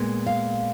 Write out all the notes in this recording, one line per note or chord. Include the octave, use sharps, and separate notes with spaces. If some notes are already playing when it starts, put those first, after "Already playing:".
Already playing: A#2 G#3 B3
F5